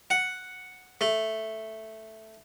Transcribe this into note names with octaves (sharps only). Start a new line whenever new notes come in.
F#5
A3